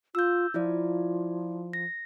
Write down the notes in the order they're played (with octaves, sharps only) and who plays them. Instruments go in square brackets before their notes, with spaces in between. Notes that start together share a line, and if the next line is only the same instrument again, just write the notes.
[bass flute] F4 [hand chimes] E6 G6
[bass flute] F3 [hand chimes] E4 F4 D5
[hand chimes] A#6